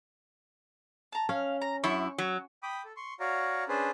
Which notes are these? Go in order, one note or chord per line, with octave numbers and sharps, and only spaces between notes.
A5 A#5
C#4 F5
A#5
F#2 E4 C#6
F#3
G5 B5 D6 D#6
A4
C6 C#6
F#4 C#5 D5 F5 A#5
C#4 D4 G#4 B4 C5